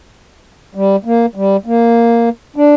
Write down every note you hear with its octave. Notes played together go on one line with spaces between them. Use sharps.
G3
A#3
G3
A#3
D4